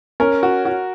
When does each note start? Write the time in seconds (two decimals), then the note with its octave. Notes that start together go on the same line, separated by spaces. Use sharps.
0.20 C#4 A#4
0.43 F#4
0.65 F#4